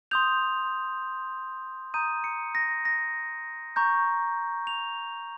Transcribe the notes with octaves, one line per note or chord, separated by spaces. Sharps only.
C6 D#6 G6 F7
A#5 D#6 G6 D#7
C#7
A#6
A#6
A#5 C#6 G6
F7